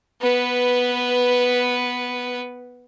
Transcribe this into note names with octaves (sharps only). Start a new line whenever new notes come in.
B3 B4